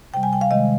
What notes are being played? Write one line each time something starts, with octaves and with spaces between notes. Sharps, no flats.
C3 G3 G5
G#5
G5
F5
C3 D#3 G#3 D#5